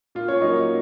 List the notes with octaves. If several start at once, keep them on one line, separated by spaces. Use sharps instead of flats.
A#2 F4
C#4 C#5
F#3 A#3 D#4 D#5